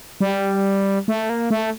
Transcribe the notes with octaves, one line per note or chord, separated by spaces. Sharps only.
G3
A3
A#3
A3